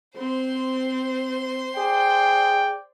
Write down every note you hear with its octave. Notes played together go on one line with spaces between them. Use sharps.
C4 C5 C6
G#4 D5 G5